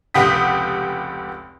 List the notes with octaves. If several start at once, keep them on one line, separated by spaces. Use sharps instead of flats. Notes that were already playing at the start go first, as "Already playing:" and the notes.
F1 C#2 G4 F#5 D#6 B6